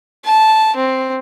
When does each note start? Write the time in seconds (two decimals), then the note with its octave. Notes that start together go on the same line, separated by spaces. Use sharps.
0.25 A5
0.76 C4